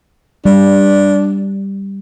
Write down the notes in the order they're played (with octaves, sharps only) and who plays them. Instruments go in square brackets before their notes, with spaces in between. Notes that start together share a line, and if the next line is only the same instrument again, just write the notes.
[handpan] G3 [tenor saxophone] D4